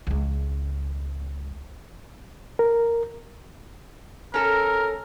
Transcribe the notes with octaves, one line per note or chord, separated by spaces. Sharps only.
C#2 G#3
A#4
C#4 A4 A#4